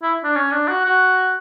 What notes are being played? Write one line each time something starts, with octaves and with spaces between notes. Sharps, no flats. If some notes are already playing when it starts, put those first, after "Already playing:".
E4
D4
C#4
D4
F#4
F#4